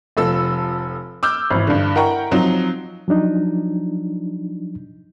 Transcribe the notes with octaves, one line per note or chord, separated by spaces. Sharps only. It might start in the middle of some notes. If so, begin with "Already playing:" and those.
F1 F3 A4 E6
D6 E6 F6 G6
G#1 E3
G2 D3
E4 A#4 F#5 G5 A#5 C#6
F3 F#3 C4 D#4
F3 F#3 D4 D#4